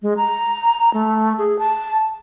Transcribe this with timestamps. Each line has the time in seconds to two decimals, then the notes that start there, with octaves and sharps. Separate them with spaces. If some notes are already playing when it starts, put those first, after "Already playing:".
0.02 G#3
0.17 A#5
0.94 A3
1.38 G#4
1.59 A5